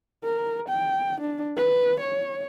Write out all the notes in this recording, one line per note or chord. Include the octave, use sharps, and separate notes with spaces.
A#4
G5
D4
B4
C#5